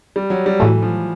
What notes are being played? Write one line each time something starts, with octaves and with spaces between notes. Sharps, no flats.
G3
F#3
G3
A2 E3 F#3 A3
F3